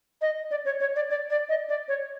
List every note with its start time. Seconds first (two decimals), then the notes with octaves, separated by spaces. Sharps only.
0.22 D#5
0.51 D5
0.65 C#5
0.81 C#5
0.96 D5
1.10 D5
1.30 D5
1.49 D#5
1.69 D5
1.88 C#5